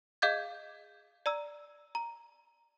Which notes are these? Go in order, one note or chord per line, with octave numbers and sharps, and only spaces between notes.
G#4 D#5 F5 D6 G6 G#6
D5 A#5 E6
A#5